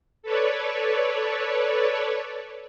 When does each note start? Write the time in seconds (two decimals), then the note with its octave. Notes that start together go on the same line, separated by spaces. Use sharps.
0.23 A4 B4 C#5 D5